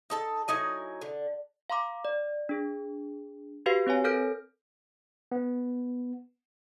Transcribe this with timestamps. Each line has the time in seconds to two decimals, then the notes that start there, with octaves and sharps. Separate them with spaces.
0.10 D#4 A4 A5
0.48 F#3 D#4 E4 G#5
1.02 D3
1.70 F5 A#5 C6 D6
2.05 D5
2.49 D4 G#4
3.66 F#4 G4 B4 F5 C7
3.87 C4 B4 C#5 G#5
4.04 A4 A#4 F6 G6 A#6 D7
5.32 B3